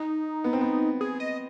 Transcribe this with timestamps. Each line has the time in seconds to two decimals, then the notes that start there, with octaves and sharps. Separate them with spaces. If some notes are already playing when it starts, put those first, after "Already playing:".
Already playing: D#4
0.44 B3
0.53 C4
0.61 B3
1.01 G#4
1.20 D#5